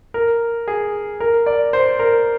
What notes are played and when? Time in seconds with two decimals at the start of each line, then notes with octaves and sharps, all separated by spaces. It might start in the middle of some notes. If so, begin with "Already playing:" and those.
0.14 A#4
0.68 G#4
1.20 A#4
1.46 D5
1.73 C5
1.99 A#4